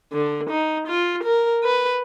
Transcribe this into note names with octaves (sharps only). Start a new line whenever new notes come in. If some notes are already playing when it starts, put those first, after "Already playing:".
D3
D#4
F4
A#4
B4